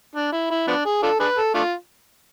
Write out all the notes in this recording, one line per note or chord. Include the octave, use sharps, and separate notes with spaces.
D4
E4
E4
F3 B3 D4
G#4
D4 F4 A4
D4 G#4 B4
A4
A3 D4 F4